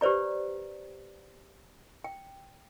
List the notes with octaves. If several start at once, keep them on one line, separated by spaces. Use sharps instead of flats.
G4 B4 C5 D5 A#5
G5